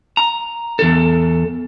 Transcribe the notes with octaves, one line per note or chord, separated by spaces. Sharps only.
A#5
E2 A4